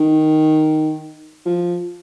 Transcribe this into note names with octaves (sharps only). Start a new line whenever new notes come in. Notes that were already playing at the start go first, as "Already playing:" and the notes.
Already playing: D#3
F3